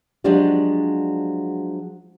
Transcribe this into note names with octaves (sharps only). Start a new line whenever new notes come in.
F3 F#3 G#3 D4 F#4 G4